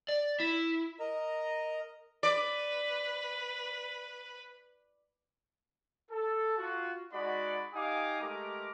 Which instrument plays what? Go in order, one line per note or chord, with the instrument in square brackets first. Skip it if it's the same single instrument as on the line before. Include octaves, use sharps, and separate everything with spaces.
[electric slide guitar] D5
E4
[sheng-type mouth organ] A#4 D#5 A#5
[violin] B4 [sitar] D5
[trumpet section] A4
F4 F#4
G#3 D#4 F#4 D5 F#5 B5
D#4 G4 F5 G#5 D6 D#6
G#3 A3 G4 A#4 A#5 D6